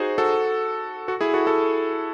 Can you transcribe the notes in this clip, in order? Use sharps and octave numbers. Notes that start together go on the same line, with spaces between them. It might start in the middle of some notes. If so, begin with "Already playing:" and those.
Already playing: D#4 F#4 G#4 C5
F#4 A4
F#4 A4
E4 G#4
F#4 A4
F#4 A4